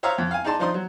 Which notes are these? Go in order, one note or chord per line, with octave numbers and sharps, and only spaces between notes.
C5 C#5 E5 F5 A#5 D#6
F2
F5 G#5
D#4 G#4 D5 A5 C6
F3 D4 D#4 C5 C6 D#6
F#3